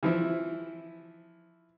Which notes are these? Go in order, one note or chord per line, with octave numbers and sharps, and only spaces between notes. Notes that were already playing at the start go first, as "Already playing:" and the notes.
E3 F3 E4